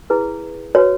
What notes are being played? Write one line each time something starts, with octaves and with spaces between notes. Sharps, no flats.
E4 G#4 B4
F#4 B4 C#5